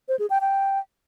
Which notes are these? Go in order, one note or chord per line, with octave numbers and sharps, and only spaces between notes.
C5
G#4
G5
G5